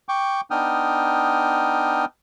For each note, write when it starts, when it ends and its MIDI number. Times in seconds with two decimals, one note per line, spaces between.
0.09 0.41 79
0.09 0.41 85
0.09 0.41 86
0.51 2.05 59
0.51 2.05 62
0.51 2.05 63
0.51 2.05 79
0.51 2.05 87
0.51 2.05 89